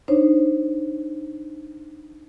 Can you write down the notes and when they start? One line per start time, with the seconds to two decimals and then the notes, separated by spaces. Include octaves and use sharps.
0.08 D4 D#4 C5 C#5